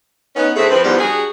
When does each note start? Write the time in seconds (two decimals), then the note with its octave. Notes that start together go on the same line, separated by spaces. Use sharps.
0.36 B3 C#4 D#4
0.56 D3 A3 C4 E4 G#4 E5
0.71 F3 C4 B4
0.84 E2 G#2 B2 F3 G3 B3
0.99 G3 D4 F#4 G#4